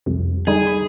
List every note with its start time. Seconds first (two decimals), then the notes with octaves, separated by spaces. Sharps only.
0.06 C2 F2 C3
0.47 D3 G3 D#4 G#4
0.67 B5